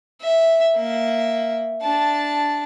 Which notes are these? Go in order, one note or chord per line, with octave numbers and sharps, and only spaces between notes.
E5
A#3 E5
D4 A5